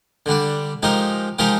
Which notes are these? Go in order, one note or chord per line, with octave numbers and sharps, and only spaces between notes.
D3 G3 D4
F3 G#3 D#4 G4 A#4
F3 G#3 D#4 G4 A#4